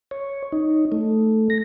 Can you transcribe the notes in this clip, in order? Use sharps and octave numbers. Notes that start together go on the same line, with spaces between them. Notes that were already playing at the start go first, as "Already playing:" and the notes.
C#5
D#4
A3
A#6